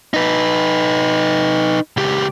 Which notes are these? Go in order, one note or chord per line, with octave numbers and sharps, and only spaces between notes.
D#4 B4
C#2 G4